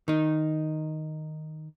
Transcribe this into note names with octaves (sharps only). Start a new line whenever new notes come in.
D#3 D#4